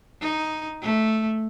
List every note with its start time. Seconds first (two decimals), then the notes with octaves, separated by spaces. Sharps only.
0.21 D#4
0.82 A3